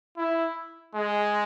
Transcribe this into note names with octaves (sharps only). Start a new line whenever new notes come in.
E4
G#3